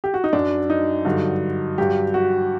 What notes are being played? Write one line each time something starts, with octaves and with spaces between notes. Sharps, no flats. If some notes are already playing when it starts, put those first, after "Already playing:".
G4
F#4
D#4
F#2 F#3 D4
D#4
G2 D3 F#3
G2 F#3 G4
F#4